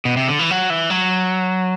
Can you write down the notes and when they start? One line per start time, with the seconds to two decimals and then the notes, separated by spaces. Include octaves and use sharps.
0.05 B2
0.17 C3
0.28 D3
0.39 E3
0.50 F#3
0.70 E3
0.90 F#3